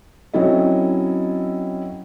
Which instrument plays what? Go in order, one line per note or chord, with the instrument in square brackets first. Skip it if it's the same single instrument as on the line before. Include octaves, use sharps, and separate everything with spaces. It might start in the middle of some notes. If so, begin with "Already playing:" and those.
[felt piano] F#3 C4 C#4 E4 A4 D#5